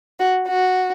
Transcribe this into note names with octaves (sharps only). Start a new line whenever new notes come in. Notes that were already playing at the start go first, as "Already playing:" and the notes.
F#4
F#4